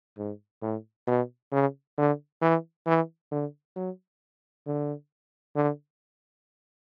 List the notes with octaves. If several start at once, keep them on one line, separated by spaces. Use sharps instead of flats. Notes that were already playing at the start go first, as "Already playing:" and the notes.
G#2
A2
B2
C#3
D3
E3
E3
D3
F#3
D3
D3